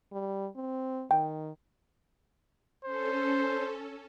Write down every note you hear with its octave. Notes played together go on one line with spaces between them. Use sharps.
G3
C4
D#3 G5
C#4 A4 C5